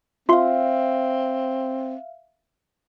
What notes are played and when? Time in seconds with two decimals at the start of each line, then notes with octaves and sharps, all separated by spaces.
0.29 C4 F4 E5 F5 C6